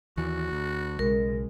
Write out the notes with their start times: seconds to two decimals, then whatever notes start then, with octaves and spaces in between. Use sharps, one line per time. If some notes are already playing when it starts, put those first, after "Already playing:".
0.17 D#2 E3 F#4
0.52 D2
0.99 B1 C#3 G#3 A#4